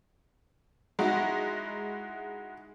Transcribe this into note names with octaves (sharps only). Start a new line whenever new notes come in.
G#3 D#4 E4 F#4